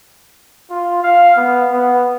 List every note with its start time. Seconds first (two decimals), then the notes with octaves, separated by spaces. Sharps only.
0.70 F4
1.02 F5
1.37 B3
1.71 B3